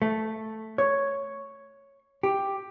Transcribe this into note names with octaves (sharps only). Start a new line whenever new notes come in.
A3
C#5
G4